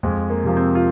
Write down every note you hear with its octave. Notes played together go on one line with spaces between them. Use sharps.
F2 G#3
A#3
C3 F3
C4
F4